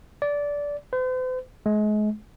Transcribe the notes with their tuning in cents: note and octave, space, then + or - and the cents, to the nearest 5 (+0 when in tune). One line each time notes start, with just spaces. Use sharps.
D5 -15
C5 -45
G#3 +35